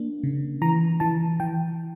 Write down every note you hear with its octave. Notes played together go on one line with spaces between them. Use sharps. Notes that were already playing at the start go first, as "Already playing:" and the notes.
Already playing: A#3 D4
C#3
E3 A#5
E3 A5
E3 G5